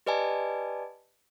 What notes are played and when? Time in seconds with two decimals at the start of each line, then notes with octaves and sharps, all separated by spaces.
0.06 G4 B4 D5 D#5 G#5 A5